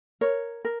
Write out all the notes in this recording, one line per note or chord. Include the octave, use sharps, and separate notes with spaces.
A#4 C#5
A#4